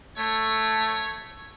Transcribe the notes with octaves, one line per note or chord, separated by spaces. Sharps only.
A3 C#5